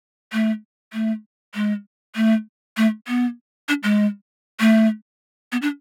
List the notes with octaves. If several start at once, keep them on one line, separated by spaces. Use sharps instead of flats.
A3
A3
G#3
A3
A3
B3
D4
G#3
A3
B3
D4